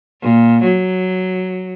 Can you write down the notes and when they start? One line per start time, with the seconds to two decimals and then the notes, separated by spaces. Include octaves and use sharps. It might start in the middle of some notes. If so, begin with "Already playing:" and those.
0.22 A#2
0.63 F#3